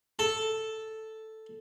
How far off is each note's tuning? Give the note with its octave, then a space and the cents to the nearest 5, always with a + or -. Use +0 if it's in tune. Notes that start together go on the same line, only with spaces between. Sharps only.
A4 +0 A5 +0